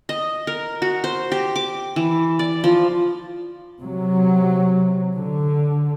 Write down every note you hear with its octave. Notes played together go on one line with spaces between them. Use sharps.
D#5
A#4
F#4
C5
G4
D6
E3
D5
F3
C3 F#3
D3